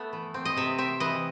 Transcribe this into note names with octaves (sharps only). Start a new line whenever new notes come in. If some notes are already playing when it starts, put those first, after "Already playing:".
Already playing: A3 B3
E3
C4
D#5
C3 E5
C4 E5
E3 D#5